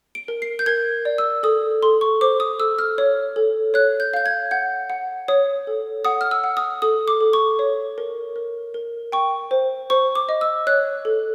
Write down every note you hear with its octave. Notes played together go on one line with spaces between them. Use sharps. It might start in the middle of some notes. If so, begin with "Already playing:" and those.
D7
A#4
C7
G6
A#4 G#6
D5
E6
A4 D#6
A4 C6
C#6
C5 D6
D#6
A4 E6
F6
C#5
A4
C#5 F#6
G6
F5 G6
G#6
F#5 G6
F#5
C#5 D#6
A4
F#5 D#6
F6
E6
F#5
D#6
A4 D#6
D6
A4
C#6
C#5
A#4
A#4
A#4
G5 C#6
C5
C5 C#6
D6
D#5
E6
C#5 F#6
A4